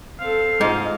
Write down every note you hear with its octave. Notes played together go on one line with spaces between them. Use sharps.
C4 A4 F5
G#2 G#3 F4 C5 D#5